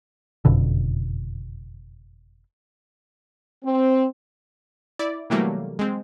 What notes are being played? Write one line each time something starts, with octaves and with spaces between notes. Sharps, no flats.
F#1 F2 B2 D3
C4
E4 D5
C3 E3 F#3 G3 A3 A#3
G#3 C4